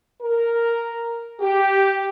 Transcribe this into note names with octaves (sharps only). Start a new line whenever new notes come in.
A#4
G4